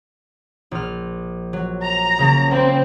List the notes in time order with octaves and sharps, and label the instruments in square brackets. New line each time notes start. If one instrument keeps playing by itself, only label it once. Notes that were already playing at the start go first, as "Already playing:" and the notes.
[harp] A#1 F6
F#3
[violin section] A#5
[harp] C#3 A#3
[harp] A#3 B5 [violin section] C4